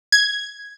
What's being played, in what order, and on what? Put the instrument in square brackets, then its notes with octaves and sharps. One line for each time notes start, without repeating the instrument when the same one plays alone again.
[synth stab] G#6